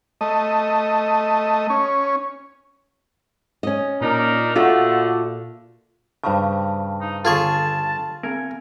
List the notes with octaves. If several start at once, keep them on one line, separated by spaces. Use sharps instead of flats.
A3 D#5
C#4
C#4 D#5
A#2 D4 D#4 A#4
D3 A3 F4 F#4 A4
G2 C#3 C5 F5 A5
D#4
D3 F4 G#4 A4 A5 C#6
B3 C4 A#4 G#5